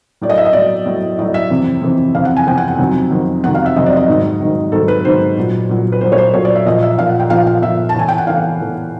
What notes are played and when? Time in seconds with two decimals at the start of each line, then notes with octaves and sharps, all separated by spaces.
0.21 A2 F#3 D5
0.29 D#5
0.38 E5
0.45 D#5
0.53 A2 F#3 D5
0.86 A2 F#3
1.18 A2 D#5
1.22 F#3
1.34 E5
1.50 F2 C3 E3
1.82 F2 C3 E3
2.15 F2 C3 E3 F5
2.25 F#5
2.37 G#5
2.47 F2 C3 E3 G5
2.58 F#5
2.68 F#5
2.79 F2 C3 D#3 F#3
3.11 F2 C3 D#3 F#3
3.44 F2 C3 D#3 F#3 F#5
3.55 F5
3.66 E5
3.76 F2 C3 D#3 F#3 D#5
3.86 D5
3.97 D#5
4.08 G#2 D#3 F#3
4.40 G#2 D#3 F#3
4.72 G#2 D#3 F#3 A4
4.88 B4
5.05 G#2 D#3 F#3 C5
5.37 A#2 F#3
5.69 A#2 F#3
5.92 B4
6.01 A#2 F#3 C5
6.12 C#5
6.18 C5
6.34 A#2 F#3 C#5
6.45 D5
6.55 E5
6.66 A#2 F3 D#5
6.83 E5
6.98 A#2 F3 F5
7.09 F#5
7.20 G5
7.30 A#2 F3 F5
7.47 F5
7.62 A#2 F3 E5
7.89 A5
7.94 A2 E3 G#5
8.08 G5
8.18 F#5
8.27 A2 E3 F5
8.59 A2 E3